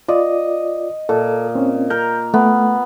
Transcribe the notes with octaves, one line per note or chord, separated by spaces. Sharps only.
F4 D5 D#5
A#2 A4
C4 C#4
A#4 G6
A3 B3